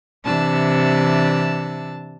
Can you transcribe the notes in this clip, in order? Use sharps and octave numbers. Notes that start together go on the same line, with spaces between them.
C3 E3 D4 A5 E6